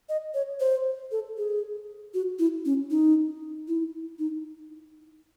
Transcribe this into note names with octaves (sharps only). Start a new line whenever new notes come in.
D#5
C#5
C5
A4
G#4
F#4
E4
C#4
D#4
E4
D#4